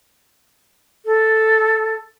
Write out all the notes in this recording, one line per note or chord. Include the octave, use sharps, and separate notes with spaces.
A4